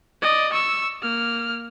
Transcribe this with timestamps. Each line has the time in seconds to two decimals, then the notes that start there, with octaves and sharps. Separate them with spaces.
0.22 D5 D#5
0.53 C#6 E6
1.03 A#3 F6